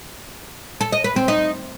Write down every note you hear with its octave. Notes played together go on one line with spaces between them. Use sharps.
A4
D#5
B4
C4
D#4